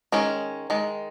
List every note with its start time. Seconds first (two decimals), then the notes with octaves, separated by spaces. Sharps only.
0.12 D#3 G#3 C#4
0.70 D#3 G#3